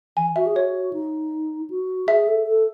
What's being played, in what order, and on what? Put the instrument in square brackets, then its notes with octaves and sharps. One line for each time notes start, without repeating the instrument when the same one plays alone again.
[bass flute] E3 [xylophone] G#5
[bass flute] F#4 [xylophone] E5
[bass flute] G#4
[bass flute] F#4 [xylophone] C#5
[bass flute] D#4
F#4
[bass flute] G#4 [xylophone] E5
[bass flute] A4
A4